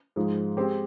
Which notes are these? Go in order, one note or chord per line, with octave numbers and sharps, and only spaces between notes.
G#2 F3 G#3
G#3 C4 G4